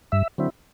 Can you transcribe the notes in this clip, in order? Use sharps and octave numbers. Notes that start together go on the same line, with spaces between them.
G2 E5
D3 F#3 C4 E4